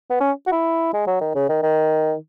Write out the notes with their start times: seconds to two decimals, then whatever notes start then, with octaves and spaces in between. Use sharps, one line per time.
0.10 B3
0.20 C#4
0.47 F#4
0.52 E4
0.93 G#3
1.07 F#3
1.21 D#3
1.35 C#3
1.49 D#3
1.63 D#3